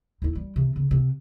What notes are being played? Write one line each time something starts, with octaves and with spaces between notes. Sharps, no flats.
D#2 E4
G3
C3 B3
C#3
C3